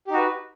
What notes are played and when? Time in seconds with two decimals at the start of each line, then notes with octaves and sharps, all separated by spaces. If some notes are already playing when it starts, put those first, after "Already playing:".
0.07 G4
0.10 D#4
0.14 F#4
0.17 B4